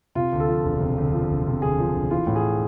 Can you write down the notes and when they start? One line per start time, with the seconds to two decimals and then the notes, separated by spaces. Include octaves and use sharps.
0.15 C3 F4
0.33 D2
0.40 A4
0.49 F3
0.64 E1
0.81 C3
0.98 D2
1.13 F3
1.30 E1
1.47 C3
1.62 D2 G#4
1.79 F3
1.95 E1
2.11 E3 F4
2.27 A2
2.36 G#4